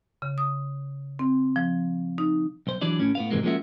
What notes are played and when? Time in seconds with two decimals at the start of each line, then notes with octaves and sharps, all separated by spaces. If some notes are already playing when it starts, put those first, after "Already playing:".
0.22 C#3
0.38 D#6
1.19 C4
1.56 F3
2.18 D#4
2.67 B1 C5
2.81 E3 F#3 D4 D5
3.00 A2 C#4
3.15 A2 B3 F5
3.31 F2 G#2 C3 E3 G#3 A#3
3.43 F3 G#3 A#3 C#4 F#4 E5